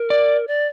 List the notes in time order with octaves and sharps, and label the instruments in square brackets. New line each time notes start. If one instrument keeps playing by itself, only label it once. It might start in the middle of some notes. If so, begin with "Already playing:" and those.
Already playing: [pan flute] A#4
[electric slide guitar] D5
[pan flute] D5